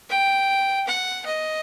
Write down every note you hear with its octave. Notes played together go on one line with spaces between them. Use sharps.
G5
F#5
D#5